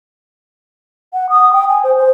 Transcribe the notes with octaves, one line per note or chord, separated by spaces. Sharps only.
F#5
D#6
G5
G#5
C5
C5